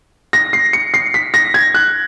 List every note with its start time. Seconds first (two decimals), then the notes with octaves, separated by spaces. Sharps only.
0.33 A#6
0.53 C7
0.73 C#7
0.94 C7
1.14 B6
1.34 A#6
1.54 G#6
1.74 F#6